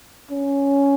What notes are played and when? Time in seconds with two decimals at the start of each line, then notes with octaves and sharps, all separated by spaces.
0.31 C#4